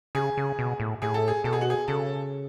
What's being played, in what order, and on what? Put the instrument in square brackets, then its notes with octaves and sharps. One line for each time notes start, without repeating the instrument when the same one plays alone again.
[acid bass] C#3 [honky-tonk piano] G#4
[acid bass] C#3
B2
A2
[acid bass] A2 [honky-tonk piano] G#4
[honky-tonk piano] A4
G#4
[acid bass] B2 [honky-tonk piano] A4
[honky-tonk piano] G#4
F#4
G#4
[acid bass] C#3 [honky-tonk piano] A4